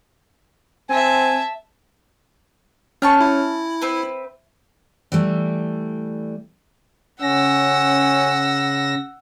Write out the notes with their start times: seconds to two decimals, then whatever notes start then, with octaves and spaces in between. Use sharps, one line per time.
0.90 C4 E5 G#5 A5
3.02 C#4 C#5 G#5 A5 C#6 F6
3.21 E4 E5
3.82 C4 B4
5.12 E3 G3 A3
7.22 C#3 C#4 F#5 E6 A#6